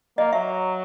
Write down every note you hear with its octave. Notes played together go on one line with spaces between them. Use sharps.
A#3 D#5
F#3 E5